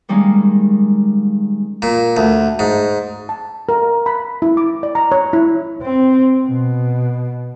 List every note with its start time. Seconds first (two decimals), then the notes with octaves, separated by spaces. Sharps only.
0.09 D#3 G3 G#3 A#3 C#4 D#4
1.82 A#2
2.17 D2
2.59 G#2
3.29 A5
3.69 A#4
4.06 B5
4.42 E4
4.57 D6
4.83 D5
4.95 A#5
5.12 C#5
5.33 E4
5.82 C4
6.46 B2